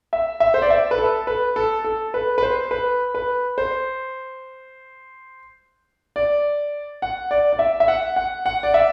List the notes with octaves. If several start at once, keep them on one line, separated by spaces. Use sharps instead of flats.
E5
E5
C5
D5
E5
B4
A4
B4
A4
A4
B4
B4
C5
B4
B4
C5
D5
F#5
D5
D5
E5
E5
F#5
F#5
F#5
D5
E5